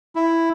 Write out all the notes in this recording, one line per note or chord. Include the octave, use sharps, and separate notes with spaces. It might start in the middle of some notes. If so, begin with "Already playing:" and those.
E4